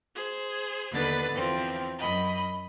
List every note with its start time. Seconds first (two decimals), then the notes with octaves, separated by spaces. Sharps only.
0.15 G#4 C5
0.92 D#2 D3 B3 B4 A6
1.33 E2 F3 C4
1.98 F#2 D#5 B5